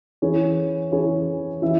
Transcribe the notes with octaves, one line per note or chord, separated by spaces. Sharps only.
E3 C#4 G#4 C#5
E3 C#4 G#4 C#5
E3 C#4 E4 C#5 E5